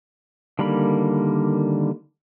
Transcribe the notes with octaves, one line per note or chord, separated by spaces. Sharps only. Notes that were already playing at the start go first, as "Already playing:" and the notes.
D3 D#3 G3 A#3 B5